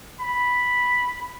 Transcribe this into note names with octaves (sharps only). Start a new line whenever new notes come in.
B5